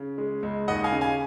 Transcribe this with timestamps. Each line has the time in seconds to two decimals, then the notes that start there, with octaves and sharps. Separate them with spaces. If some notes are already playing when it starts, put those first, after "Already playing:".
Already playing: C#3
0.18 G#3
0.43 C#2
0.68 D#2 D#5 F#5
0.84 F5 G#5
0.92 C#3
1.01 F5 G#5